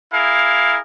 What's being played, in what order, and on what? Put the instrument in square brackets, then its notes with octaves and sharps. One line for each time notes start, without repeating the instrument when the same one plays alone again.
[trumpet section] E4 G#4 A#4 F5